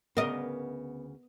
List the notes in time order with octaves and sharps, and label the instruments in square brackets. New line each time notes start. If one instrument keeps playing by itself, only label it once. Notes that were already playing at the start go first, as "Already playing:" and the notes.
[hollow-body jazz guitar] D2 C#3 [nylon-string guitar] B3 [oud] A#4 D#5